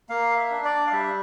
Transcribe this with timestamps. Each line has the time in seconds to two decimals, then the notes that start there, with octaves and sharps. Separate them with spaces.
0.09 A#3 F5
0.37 E5
0.51 D4
0.65 D5
0.87 F5
0.92 G3 E5